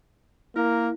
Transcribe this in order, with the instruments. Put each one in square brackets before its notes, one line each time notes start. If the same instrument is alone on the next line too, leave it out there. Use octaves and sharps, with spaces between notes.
[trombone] A#3 [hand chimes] E4 [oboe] A#4